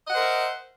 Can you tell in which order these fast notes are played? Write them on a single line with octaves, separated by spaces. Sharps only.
D#5 F#5 C5 A#4 E5